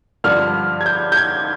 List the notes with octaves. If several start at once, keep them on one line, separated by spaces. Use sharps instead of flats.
G2 D3 F3 F6
G#6
G6
G6
G#6